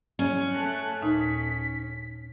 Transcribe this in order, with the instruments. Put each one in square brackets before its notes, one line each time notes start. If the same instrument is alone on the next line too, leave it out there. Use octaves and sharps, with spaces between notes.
[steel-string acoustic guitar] C#4
[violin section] A3 A5 F#6
[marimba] D#2 A#2 D#4 [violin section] B6